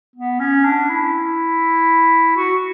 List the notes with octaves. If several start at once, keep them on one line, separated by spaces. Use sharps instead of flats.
B3
C#4
D4
E4
F#4